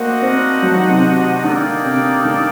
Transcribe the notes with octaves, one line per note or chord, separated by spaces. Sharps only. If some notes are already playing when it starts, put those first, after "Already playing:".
Already playing: A#3 D4 F#4 C5 D#5 F#5
C4
F#3
D#3
C3
D3 A#3 D#4 A4 D5 G5
C3
D3